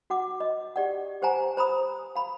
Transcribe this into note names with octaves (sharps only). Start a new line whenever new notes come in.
F#4 F#5 D6
D#5
G4 D5 F#5
G4 C5 F#5 G#5 A#5
C5 A#5 B5 D#6
F5 B5